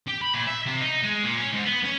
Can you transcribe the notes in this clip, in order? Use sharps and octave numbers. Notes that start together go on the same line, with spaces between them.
G4
B5
A#2
E5
C3
D#4
G#3
A#2
C#4
G#2
B3
C#4